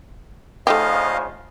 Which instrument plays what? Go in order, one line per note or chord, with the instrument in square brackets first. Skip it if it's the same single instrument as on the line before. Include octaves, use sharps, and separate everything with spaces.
[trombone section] D2 C#3 F3 [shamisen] A3 D#4 G4 [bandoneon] D#5 F5